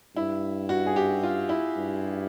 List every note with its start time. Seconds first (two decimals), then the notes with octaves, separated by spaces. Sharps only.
0.16 G2 E4
0.69 F#4
0.86 G#4
0.96 G4
1.23 F4
1.49 E4
1.76 G2